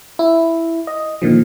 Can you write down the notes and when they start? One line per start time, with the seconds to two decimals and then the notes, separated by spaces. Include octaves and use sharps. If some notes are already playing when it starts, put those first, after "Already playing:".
0.19 E4
0.87 D#5
1.22 A#2 D3 D#3 F3